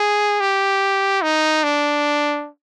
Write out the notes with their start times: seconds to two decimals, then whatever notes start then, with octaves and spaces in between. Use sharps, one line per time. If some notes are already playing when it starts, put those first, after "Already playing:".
Already playing: G#4
0.40 G4
1.22 D#4
1.64 D4